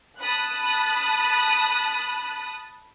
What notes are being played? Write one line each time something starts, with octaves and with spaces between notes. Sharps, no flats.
A5 B5 D#6 F#6